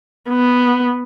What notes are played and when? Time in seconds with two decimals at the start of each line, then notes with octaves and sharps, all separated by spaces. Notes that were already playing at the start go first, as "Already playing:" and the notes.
0.29 B3